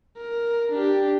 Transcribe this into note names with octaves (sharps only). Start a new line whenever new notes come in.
A#4
D4 G4